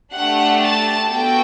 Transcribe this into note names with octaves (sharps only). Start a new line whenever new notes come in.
A3 D4 G4 F#5
A5
B3 F#4 A4 G5